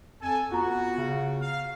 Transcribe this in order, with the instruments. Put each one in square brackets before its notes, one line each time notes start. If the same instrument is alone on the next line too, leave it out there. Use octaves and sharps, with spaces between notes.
[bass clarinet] F2 [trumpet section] A4 G#5
[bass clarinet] B3 [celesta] F4 A#5 [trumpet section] F#4
[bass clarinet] C#3
[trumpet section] F5